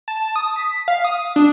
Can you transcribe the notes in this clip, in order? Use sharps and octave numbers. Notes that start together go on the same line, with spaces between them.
A5
D#6
B6
F5
D#6
D4